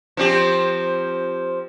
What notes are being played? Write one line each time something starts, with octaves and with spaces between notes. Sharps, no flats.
F3 C4 G4